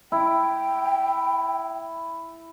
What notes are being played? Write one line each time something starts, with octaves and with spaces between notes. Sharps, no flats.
E4 G5